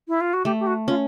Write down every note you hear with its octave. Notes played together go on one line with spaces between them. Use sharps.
E4
F4
F#4
A3 G4
G4
F#4
C#4 F4